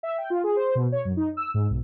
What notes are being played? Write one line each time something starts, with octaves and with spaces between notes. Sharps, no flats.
E5
G5
F4
G#4
C5
B2
C#5
F#2
D#4
E6
G#2
B1